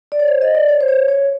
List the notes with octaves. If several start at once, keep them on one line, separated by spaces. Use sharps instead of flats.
D5
C#5
C5
D#5
D5
C#5
C5
C#5
C#5